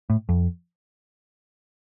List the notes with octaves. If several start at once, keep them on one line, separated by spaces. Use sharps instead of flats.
A2
F2